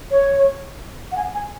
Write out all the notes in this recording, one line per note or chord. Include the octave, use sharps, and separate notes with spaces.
C#5
F#5
G#5
G#5